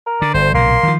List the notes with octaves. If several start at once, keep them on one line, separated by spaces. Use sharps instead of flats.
A#4
D3 D5
G1 D2 C5
B1 A#2 C#3 A#3 C6
D#3 F3